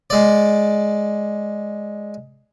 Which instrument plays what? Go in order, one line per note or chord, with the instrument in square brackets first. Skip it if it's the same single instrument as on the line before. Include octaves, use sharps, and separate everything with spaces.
[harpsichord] G#3 D5